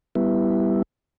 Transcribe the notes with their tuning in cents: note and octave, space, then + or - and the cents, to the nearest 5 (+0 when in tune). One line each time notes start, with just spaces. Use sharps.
G3 +0 B3 +0 E4 +0